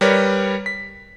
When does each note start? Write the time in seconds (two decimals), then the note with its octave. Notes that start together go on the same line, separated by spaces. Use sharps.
0.01 G3 A#4 B4 C#5 D5
0.66 B6